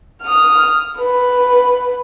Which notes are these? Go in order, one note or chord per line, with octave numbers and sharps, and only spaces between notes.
D#6 F6
B4